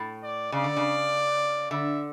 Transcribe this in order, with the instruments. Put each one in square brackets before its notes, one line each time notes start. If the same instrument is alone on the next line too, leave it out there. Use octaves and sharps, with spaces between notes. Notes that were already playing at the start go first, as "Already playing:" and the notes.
Already playing: [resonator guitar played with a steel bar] A2
[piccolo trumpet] D5
[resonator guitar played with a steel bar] C#3 [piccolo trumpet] D5
[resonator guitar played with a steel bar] D3
C#3
[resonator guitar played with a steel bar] D3 [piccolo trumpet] E5